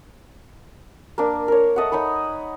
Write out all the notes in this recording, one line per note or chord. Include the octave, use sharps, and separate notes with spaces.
A#3 D4
A#4 C#5
A4 D#5 E5 F#5
D#4 C#5 G#5 B5